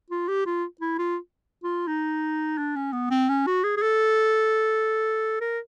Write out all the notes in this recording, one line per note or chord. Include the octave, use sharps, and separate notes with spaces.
F4
G4
F4
E4
F4
F4
D#4
D4
C#4
B3
C4
C#4
F#4
G#4
G#4
A4
A#4